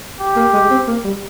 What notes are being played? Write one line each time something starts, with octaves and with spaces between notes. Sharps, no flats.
G4
A#3
G#3
C4
A#3
G3